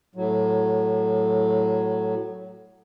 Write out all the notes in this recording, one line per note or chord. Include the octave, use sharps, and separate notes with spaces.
A2 F#3